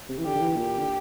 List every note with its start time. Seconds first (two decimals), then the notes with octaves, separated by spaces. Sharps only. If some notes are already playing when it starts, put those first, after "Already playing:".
0.09 C3
0.18 E3
0.25 D3 G4
0.35 D3
0.41 E3
0.56 A#2 G4
0.78 D3